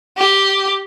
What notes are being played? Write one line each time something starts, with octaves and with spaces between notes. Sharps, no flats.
G4